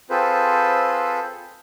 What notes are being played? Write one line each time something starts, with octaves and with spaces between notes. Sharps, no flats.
C4 F4 G#4 A4 B4 C5